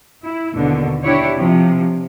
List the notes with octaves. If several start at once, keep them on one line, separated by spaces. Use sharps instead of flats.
E4
D#2 B2 D3
D4 E4 G4 C#5
C3 F3